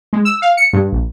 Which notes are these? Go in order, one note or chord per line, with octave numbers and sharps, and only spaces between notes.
G#3
E6
F5
C#7
G2
A#1